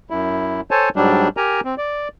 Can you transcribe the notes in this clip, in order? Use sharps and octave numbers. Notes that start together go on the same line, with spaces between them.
F#2 E4
A4 C5 C#5 G#5 A5
G#2 F#3 G3 D4
G4 A#4 G#5 A#5
C4
D5